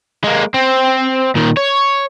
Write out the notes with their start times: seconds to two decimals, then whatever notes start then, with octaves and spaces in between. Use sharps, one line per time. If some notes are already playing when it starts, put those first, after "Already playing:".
0.24 G#3 A#3
0.54 C4
1.35 A#2 D#3
1.57 C#5